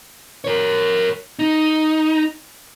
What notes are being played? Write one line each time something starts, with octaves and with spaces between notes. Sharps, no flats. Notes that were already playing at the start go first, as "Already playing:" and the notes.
A#4 C#5
D#4